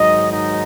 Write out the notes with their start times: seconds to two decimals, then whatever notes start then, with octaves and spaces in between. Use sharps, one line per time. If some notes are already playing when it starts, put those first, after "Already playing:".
Already playing: G#2 D#3 F#3 D#4 D#5
0.31 D#4 D#5